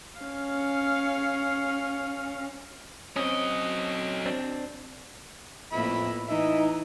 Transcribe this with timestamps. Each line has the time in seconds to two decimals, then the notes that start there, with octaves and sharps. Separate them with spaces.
0.20 C#4 F5
3.16 F#3 C4 C#4 D#5
4.26 C4 D4
5.72 F2 A2 A#3 B3 E5 B5
6.29 E3 D#4 D#5 E5